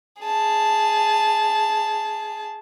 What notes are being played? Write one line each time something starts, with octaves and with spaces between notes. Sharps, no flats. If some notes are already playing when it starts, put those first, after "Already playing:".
G#4 A5